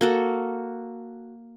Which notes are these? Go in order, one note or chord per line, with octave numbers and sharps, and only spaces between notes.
A#3 F#4 A4